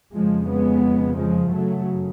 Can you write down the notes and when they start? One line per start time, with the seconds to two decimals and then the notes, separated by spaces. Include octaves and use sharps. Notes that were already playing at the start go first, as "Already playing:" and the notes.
0.13 F2 C#3 F3 G#3
0.48 G#3 B3
1.18 F3 G#3
1.51 F#2 C#3 F#3 A3